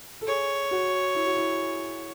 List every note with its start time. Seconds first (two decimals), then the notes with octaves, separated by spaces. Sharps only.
0.21 A4
0.27 G#4 C#5
0.71 F#4
1.15 E4
1.27 F#4
1.37 E4